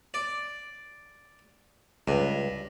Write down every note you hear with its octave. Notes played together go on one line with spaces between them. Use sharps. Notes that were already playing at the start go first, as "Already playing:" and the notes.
D5
C#2 G2